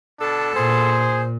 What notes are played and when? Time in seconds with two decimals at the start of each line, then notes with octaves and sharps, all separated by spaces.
0.20 B2 D4 A4
0.55 A#2 G#4 C5